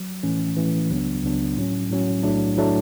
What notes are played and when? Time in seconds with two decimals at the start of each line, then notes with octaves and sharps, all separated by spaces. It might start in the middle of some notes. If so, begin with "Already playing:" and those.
Already playing: F#3
0.23 A2 E3 A3 C#4
0.57 A2 E3 A3 C#4
0.90 C#2 C#3 F#3 B3 D4
1.23 C#2 C#3 F#3 B3 D4
1.57 A2 F#3 C#4
1.90 A2 F#3 C#4
2.23 B1 A2 F#3 A3 D4
2.57 A2 F#3 A3 D4